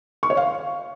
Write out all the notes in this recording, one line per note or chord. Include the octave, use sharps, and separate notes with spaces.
C#6
C#5
F5